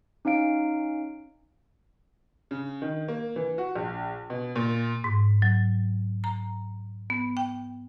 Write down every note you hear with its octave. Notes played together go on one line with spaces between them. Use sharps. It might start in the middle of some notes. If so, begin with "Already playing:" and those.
C#4 D#4 C#5 F5 D7
C#3
D#3
A#3
E3
F#4
A#1
B2
A#2
G#2
F#3
A#5
B3
G5